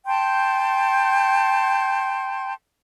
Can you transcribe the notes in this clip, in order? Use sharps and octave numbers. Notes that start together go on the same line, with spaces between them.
G5 A5 C6 G6